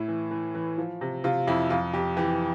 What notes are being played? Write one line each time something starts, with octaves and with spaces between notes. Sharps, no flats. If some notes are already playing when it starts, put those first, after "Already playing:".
Already playing: A2 E4
E3
E3
E3
F3
C3
C3 F4
F2 E4
F2 F4
F2 G4
E3 G4